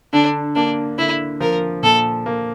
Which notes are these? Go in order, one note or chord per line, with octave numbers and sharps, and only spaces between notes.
D3 D4
A#3 D4
D3 E4
F3 A#4
A#2 A4
A#3